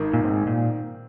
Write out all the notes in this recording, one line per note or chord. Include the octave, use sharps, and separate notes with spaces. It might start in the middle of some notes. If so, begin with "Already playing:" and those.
Already playing: G#1 D#3
A#2
G#2 C4
A#2